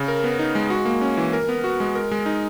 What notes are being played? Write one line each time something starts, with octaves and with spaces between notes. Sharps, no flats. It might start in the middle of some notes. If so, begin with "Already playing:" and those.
Already playing: C#3
A#4
B3
D#4
G#3
F#4
A#3
C#4
E3
A#4
B3
F#4
G#3
A#4
G#3
D#4